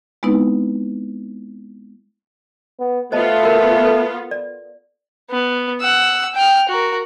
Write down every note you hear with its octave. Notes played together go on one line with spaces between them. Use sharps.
G#3 B3 C4 D#4 E4 B4
B3
A3 B3 F4 C5 D#5 A5
F#4 A#4
A4 B4
D5
B3
F#5 E6
G5 F6
F#4 A#4